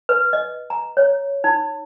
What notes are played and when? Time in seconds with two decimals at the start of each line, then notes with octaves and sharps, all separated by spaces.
0.09 B4
0.33 D#5
0.70 A#5
0.97 C#5
1.44 D#4